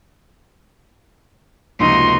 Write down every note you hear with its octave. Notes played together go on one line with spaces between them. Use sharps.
F1 C#2 A#3 D#4 F#4 C6